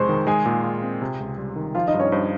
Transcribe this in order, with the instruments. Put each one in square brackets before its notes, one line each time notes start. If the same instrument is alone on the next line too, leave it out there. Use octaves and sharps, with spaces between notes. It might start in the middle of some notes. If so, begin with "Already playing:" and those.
Already playing: [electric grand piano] F2 C3 G#3 [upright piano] C5 C6 C#6
[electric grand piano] D#3
[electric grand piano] G#3 [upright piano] G#4 G#5
[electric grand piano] A#2
F4
C4
C3
C#2
G3
D#3
[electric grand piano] F3 [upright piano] F4 F5
[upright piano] D#4 D#5
[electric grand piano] G2
[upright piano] C#4 C#5
[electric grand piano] G2 [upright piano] C5